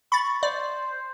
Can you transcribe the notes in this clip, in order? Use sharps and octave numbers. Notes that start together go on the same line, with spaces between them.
B5 C#6 A6
C5 D5